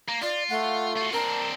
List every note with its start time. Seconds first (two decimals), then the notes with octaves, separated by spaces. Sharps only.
0.08 A#3
0.22 F4 D5
0.49 A3 F#5
0.96 F4 F#4
1.13 C4 D4 A#4 A5